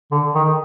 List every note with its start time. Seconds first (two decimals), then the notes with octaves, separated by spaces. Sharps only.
0.12 D3
0.35 D#3